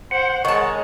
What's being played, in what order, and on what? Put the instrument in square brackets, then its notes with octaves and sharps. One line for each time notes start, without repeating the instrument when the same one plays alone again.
[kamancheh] C5 [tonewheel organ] F#5
[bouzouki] D#3 A5 [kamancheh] G#3 C#5 [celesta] C#6